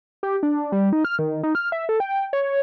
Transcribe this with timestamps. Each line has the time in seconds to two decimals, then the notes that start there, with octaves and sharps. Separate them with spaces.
0.23 G4
0.43 D4
0.72 G3
0.93 D#4
1.05 F6
1.19 D#3
1.43 D#4
1.55 F6
1.72 E5
1.89 A4
2.00 G5
2.33 C#5